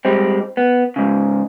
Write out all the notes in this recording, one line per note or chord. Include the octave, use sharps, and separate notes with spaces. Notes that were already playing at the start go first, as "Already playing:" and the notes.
G3 G#3 C4
B3
G#2 C#3